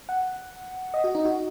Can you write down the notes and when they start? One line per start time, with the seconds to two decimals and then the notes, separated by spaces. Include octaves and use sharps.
0.09 F#5
0.94 D#5
1.04 F#4
1.15 D#4
1.25 F#4